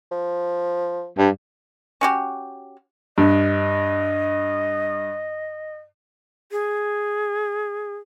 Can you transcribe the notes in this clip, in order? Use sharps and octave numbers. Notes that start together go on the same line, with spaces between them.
F3
G2 D4
C#4 F#4 G4
G2 D#5
G#4